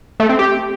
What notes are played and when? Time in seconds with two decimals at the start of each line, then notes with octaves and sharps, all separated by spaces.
0.20 A3
0.29 C4
0.39 G4